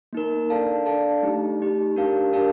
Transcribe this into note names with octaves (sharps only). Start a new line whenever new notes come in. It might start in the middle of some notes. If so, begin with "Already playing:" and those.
A#3 D#4 A#4
D4 A4 D5 F5 A5
D4 A4 D5 F5 A5
A3 D#4 G4
A3 D#4 G4
D4 G4 A#4 F5 A5
D4 G4 A#4 F5 A5